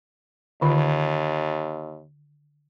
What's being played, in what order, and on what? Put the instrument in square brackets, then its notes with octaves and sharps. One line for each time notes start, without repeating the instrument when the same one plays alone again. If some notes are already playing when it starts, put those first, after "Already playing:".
[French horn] D#2 [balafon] D3 D#3 F4